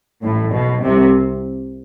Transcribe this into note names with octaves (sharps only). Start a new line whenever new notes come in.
A1 A2
B1 B2
C2 C3